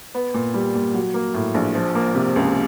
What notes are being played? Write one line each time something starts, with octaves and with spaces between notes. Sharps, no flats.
B3
A#2
G3
A#2
F#3
A#3
A2
A#1
F3
A#3
C3
C#2